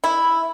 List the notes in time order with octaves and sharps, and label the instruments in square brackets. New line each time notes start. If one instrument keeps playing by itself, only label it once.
[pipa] E4